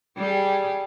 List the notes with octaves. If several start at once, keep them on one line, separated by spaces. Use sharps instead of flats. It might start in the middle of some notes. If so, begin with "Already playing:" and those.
G3 G4 G#4